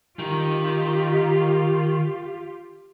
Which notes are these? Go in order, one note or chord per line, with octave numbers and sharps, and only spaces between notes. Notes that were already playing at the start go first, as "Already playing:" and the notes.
D#3 F4 G4